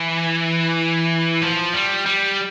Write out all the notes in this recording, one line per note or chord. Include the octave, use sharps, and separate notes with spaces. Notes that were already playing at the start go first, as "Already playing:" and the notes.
Already playing: E3
F3
G3
G3